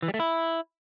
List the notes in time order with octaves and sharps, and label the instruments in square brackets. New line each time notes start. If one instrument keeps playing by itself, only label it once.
[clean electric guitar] E3
G3
A3
E4